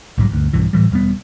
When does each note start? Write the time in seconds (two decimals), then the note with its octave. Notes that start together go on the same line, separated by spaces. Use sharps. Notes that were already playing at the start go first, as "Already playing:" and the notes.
0.18 B1 G#2 E3 F#3
0.30 G1 D2
0.53 B1 G2 E3
0.73 A2 E3 G3
0.91 E1 G3 B3